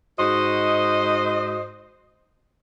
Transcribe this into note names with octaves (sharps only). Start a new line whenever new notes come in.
G#2 F#4 C5 D#5